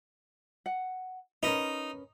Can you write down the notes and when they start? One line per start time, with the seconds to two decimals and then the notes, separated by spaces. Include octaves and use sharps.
0.66 F#5
1.43 C#4 D#4 A#4 B4